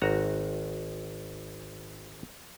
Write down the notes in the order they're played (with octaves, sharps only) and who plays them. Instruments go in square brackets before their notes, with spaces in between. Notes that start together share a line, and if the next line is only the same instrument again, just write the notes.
[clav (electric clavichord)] G#1 F#4 A#5